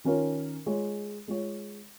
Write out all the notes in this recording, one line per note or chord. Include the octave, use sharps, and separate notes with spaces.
D#3 C#4 F4 A#4 C#5
G#3 F4 C#5
G#3 F4 C#5